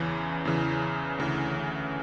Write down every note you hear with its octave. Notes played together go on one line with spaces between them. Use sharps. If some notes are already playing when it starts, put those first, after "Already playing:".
Already playing: E2 C#3 E3
E2 C#3 E3
D2 C#3 E3